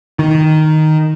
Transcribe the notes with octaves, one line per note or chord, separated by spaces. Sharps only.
D#3